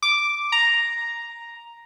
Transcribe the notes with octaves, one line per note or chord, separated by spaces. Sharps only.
D6
A#5